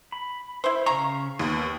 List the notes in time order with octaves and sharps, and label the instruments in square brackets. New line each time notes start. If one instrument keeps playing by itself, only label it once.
[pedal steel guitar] B5
[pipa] E4 C5
[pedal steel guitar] C#3 F5 C#6 [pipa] A#5
[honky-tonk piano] D#2 [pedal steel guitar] B3